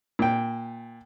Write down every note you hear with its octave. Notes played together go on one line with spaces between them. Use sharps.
A#2 G5